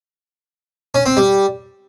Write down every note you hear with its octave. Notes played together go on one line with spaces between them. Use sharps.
C#4
C4
G3